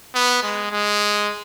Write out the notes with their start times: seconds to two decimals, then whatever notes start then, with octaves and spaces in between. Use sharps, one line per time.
0.14 B3
0.43 G#3
0.71 G#3